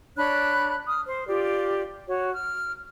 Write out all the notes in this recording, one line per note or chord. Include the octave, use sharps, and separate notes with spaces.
D4 C#5 B5 F#6
D#6 F6
C5
F4 G4 D5
F#4 C#5
F6